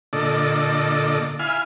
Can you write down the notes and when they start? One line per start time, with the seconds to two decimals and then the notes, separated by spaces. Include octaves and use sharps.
0.13 A#2 D3 A4 D5 D#5
1.39 E4 F5 G#5 F6